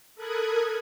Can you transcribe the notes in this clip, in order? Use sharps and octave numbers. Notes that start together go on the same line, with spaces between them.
A4 A#4 B5 D#6 F#6 G#6